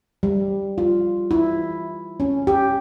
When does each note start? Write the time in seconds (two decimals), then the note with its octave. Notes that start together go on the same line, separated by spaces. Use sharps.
0.23 G3
0.78 F4
1.31 E4
2.20 C#4
2.47 G4